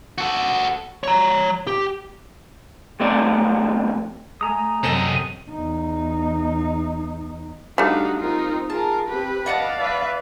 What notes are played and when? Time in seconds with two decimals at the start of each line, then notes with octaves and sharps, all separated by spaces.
0.18 F#4 A4
1.04 C#5 A#5
1.67 G4
3.00 B1 F2 A3 C4 D5
4.41 A3 G#5 A#5 D#6
4.83 F#2 C3 C4 A4 D#5 E7
5.50 E2 D#4
7.78 G3 A3 D4 D#4 F#4 F5
8.19 C4 D#4 F4 A#4
8.70 F4 G#4 A#4 A5
9.08 C4 G4 B4
9.46 D5 D#5 F5 F#5 A5
9.80 B4 E5